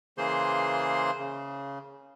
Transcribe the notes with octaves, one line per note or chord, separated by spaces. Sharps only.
C#3 E3 A#3 G#4 C5 C6
C#3